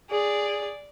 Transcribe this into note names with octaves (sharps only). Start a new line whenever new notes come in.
G#4 D5